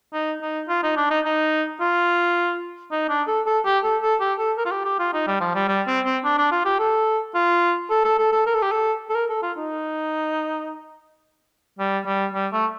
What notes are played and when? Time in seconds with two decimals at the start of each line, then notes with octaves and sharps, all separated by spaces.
0.13 D#4
0.42 D#4
0.69 F4
0.83 D#4
0.97 D4
1.10 D#4
1.25 D#4
1.81 F4
2.92 D#4
3.09 D4
3.28 A4
3.46 A4
3.66 G4
3.84 A4
4.02 A4
4.21 G4
4.39 A4
4.58 A#4
4.66 F4
4.72 G4
4.85 G4
4.99 F4
5.13 D#4
5.27 G3
5.41 F3
5.55 G3
5.68 G3
5.87 C4
6.05 C4
6.24 D4
6.38 D4
6.52 F4
6.66 G4
6.80 A4
7.35 F4
7.90 A4
8.05 A4
8.19 A4
8.32 A4
8.46 A#4
8.55 A4
8.63 G4
8.71 A4
9.10 A4
9.15 A#4
9.30 A4
9.43 F4
9.57 D#4
11.79 G3
12.06 G3
12.34 G3
12.53 A3